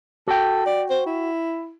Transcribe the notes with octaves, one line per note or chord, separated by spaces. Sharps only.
F#4 A4 G5
D5
C5
E4